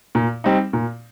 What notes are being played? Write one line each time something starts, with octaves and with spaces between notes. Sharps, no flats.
A#2
G3 C4 D#4
A#2